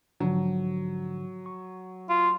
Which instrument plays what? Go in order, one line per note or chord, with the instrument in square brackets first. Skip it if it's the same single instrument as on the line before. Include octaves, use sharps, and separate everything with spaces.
[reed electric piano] G#2 D3 F3 [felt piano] F#3
[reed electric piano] C#6
[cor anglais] F4